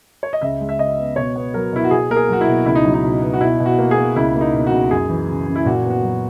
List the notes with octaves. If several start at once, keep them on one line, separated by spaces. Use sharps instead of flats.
C#5
D#5
C#2 E5
G#3
E5
C#3 D#5
B3
B2 C#5
B3
F#3 A#4
B2 E4
F#4
B2 G#4
A#3 A#4
G#4
F#3 F#4
E4
B2
C#2 E4
D#4
F#3
D#4
B2
B3
F#4
B2 E4
B2
F#4
A#3
G#4
A#3
C#2 E4
A#3
D#4
B2
F#4
C#2
F#2 G#4
E3
C#3
F#2
E4
A#2 F#4
B3
F#4
F#3